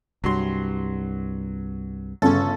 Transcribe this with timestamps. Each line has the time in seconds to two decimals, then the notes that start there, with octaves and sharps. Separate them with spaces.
0.24 C2 G2 F#3 C6
2.22 G1 C#3 C#4 A4